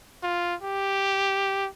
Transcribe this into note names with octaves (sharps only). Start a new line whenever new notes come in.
F4
G4